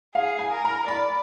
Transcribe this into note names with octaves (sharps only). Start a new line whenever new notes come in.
G#4 F5
G#5
A#4
A#5
D5 B5